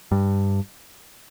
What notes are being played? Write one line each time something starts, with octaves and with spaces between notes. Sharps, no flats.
G2